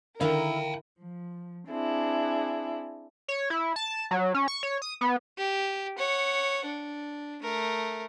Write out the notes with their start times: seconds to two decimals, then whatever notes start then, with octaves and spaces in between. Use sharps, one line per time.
0.21 D3 D#3 E4 A#4 F5 G5
0.99 F3
1.69 C4 D4 E4 G#4
3.28 C#5
3.50 E4
3.76 A5
4.11 F#3
4.35 C#4
4.48 C#6
4.63 C#5
4.82 D#6
5.01 B3
5.38 G4
5.98 C#5 F#5
6.66 D4
7.43 A3 A#4